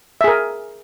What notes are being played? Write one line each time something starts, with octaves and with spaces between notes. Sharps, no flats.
G#4 A#4 E5